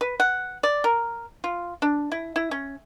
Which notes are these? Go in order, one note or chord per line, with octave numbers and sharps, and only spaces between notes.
B4
F#5
D5
A#4
F4
D4
E4
E4
C#4